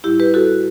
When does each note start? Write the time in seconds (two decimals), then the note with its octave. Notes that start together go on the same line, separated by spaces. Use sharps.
0.04 A2 G3 E4 G4
0.20 G4 B4
0.34 F#4 A4